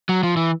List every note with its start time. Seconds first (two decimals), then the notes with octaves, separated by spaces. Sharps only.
0.09 F#3
0.23 F3
0.37 E3